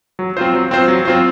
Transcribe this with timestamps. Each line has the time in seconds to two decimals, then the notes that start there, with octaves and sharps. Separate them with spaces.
0.19 F#3
0.37 C4 F4 C5
0.54 F#3
0.71 C4 F4 C5
0.88 F#3
1.05 C4 F4 C5